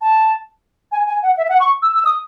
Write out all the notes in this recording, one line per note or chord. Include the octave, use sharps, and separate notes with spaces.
A5
G#5
G#5
F#5
E5
F#5
C#6
E6
E6
D#6